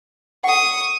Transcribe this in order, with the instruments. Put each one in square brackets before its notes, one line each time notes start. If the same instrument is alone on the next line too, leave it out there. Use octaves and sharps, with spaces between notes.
[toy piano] A4 F#5 [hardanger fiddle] C#6 D#6